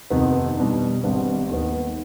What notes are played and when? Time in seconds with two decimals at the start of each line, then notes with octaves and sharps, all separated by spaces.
0.10 F2 C3 D#3 B3 D#4
0.57 B2 G3 D4
1.04 G#1 G#2 G3 B3 D4
1.49 D#2 D#3 B3